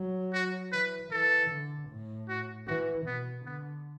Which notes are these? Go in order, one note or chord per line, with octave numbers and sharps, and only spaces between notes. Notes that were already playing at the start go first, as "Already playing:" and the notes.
Already playing: F#3
F#4
E3 B4
E3 A4
D3
A2
F#4
E3 F#4
B2 B3
D3 B3